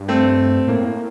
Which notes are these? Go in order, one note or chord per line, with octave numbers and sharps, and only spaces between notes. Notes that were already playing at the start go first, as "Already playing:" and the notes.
Already playing: G2
A3 C4
A2 A#3
A#3